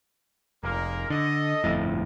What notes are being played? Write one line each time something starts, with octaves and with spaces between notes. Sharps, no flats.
F1 G#3 A#3 A#4
D3 A4 D#5
G1 F2 A2